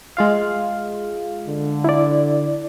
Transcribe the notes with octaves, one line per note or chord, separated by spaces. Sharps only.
G#3 F4 F5
D3
E4 D5